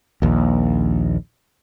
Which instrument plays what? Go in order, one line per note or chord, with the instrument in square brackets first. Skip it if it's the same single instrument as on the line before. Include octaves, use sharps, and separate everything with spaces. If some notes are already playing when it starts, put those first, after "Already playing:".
[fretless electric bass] A#1 D#2